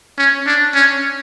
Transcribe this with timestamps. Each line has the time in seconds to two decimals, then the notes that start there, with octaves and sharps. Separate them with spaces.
0.18 C#4
0.47 D4
0.74 C#4